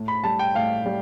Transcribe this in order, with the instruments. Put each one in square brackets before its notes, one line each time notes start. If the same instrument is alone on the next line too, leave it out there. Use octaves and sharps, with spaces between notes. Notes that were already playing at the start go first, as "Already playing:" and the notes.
Already playing: [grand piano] A2
B5
G3 A5
G5
A2 F5
G3